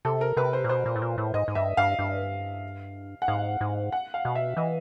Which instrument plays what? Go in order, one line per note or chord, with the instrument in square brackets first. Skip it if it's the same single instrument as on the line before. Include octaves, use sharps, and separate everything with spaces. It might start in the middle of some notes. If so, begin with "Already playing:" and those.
[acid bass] C3 [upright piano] A4
[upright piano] A#4
[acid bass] C3 [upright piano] B4
[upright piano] C5
[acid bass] A#2
[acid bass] B2 [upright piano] C5
[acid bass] A#2
A2
A#2
A2
[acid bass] G#2 [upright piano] D#5
[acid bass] G#2
[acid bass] G2 [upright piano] E5
[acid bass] G2 [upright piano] F5
[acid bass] G2
[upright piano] F#5
[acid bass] G#2 [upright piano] F5
[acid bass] G#2
[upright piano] F#5
F5
[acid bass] B2
[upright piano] E5
[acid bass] E3 [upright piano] D#5